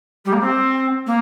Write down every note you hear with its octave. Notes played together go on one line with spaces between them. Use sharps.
G3
A#3
C4
A#3